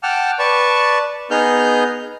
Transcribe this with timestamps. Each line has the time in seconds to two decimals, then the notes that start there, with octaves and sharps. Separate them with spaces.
0.03 F#5 G5 A5 D6 F6
0.39 B4 D5 A5 C#6
1.31 B3 D#4 G#4 F6 G6